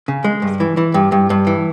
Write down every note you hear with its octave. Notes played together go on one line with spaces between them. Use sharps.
C#3
G#3
G2
E3
E3
G2
G2
G2
E3